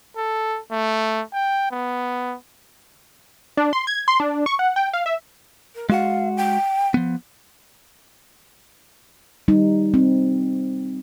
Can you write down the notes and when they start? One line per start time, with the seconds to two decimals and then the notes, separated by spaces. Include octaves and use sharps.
0.17 A4
0.72 A3
1.33 G5
1.72 B3
3.57 D4
3.73 C6
3.87 G#6
4.08 C6
4.20 D4
4.46 C#6
4.59 F#5
4.76 G5
4.93 F5
5.06 E5
5.75 A#4
5.90 G#3 F#4 F5 F#5
6.37 G5
6.94 F3 B3
9.48 G3 D#4
9.94 C4